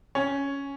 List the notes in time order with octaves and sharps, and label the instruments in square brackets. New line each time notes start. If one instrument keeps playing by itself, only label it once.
[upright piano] C#4